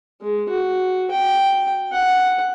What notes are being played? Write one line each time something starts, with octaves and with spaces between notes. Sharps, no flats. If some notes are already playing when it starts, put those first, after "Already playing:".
G#3
F#4
G5
F#5